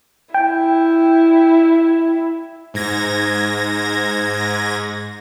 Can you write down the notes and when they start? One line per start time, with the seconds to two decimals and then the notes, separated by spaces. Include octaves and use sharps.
0.34 E4 G5
2.74 G#2 G#6 A#6